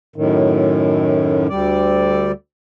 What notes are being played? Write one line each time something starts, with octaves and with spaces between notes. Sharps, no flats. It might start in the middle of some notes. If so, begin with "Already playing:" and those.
F#2 A2 D#3
D2 G3 D5